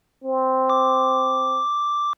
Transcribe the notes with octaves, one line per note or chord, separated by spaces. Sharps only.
C4
D6